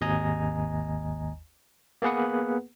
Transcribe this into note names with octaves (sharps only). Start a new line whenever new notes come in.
G#1 D#2 D#5 G#5 A#5
A#3 B3 G#4 B4 F#5